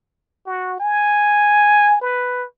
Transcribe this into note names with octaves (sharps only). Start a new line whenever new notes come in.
F#4
G#5
B4